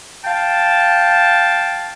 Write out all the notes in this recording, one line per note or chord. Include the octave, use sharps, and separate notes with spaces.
F5 G5 A5